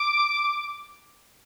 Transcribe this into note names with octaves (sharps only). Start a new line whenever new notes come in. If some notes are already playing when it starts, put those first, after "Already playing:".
Already playing: D6